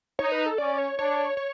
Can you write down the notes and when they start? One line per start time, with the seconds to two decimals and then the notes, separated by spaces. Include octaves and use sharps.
0.19 D#4 C#5
0.32 B4
0.46 A4
0.58 C#4 D5
0.78 C#5
0.98 D4 C#5
1.37 C#5